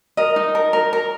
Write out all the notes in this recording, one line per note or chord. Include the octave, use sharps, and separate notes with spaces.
A#4 D#5
D#4
A#4
A#4
A#4